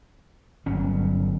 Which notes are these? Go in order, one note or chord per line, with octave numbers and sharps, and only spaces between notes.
G1 F#3 C#4